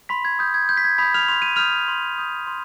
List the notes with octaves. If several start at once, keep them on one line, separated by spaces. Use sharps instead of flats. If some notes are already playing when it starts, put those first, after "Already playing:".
B5 C6 B6
G#6
D#6 G6
G#6
C6 G6
B6
G#6
B5 D#6 G6 B6
F6 F7
C6 F7
D#7
D#6 F6 G6 F7
C6
D#6 G6
C6